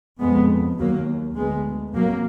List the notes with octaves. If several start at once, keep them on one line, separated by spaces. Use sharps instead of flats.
F2 G#3 B3
D#2 F#3 A#3
D2 G#3 B3
F2 F#3 A#3